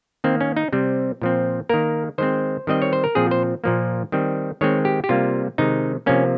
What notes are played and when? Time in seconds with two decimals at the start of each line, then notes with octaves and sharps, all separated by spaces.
0.24 D#3 A#3 C4
0.41 C#4
0.56 D#4
0.72 C3 G3 C4
1.22 A#2 F3 C4
1.69 D#3 A#3 A#4
2.18 D#3 G#3 C4 C5
2.67 D#3 G3 C4 D#5
2.82 C#5
2.93 C5
3.04 A#4
3.15 A#2 F3 C4 G#4
3.31 C5
3.64 A#2 F3 A#3
4.12 D#3 G3 C4
4.61 D#3 G#3 C4 C#5
4.85 G4
5.04 G4
5.09 C3 G3 A#3 F4
5.58 C3 D#3 G#3 D#4
6.06 C3 F3 A#3 C#4